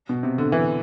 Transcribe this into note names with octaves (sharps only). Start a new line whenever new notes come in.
B2
C3
D3
E3